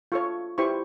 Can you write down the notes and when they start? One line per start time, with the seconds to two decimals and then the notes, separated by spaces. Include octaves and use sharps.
0.12 F4 A4 C#5 C#6
0.58 E4 G4 C5 C#6